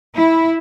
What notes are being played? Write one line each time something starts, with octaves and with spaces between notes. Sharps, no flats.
E4